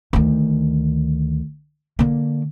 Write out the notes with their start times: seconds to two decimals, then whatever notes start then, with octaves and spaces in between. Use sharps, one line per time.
0.13 D2 D#3
1.99 D3 A#3